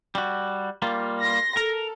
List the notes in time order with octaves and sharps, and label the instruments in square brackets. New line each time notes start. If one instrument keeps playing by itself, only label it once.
[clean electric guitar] G3 F#4
G3 A#3 F4
[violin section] C6 A#6
[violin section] A4 [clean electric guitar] A#4